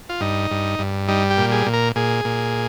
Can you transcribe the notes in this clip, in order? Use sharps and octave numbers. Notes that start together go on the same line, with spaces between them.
F4
G2 D#4
G2
G2
G3 D#4
G4
A#2
G#4
A#2
A#4
A#2 G#4
A#2